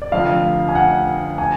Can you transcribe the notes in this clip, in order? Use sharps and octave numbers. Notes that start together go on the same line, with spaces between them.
D5
F1 F2 D3 F3 A3 F5
G#5
F#5
G#5